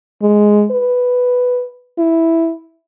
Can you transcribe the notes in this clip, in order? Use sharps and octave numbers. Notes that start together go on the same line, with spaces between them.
G#3
B4
E4